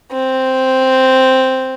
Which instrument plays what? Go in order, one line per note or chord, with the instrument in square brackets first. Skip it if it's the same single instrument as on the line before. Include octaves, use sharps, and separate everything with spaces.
[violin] C4